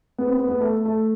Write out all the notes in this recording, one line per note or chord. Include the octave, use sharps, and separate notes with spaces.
B3
C4
B3
B3
A3
A3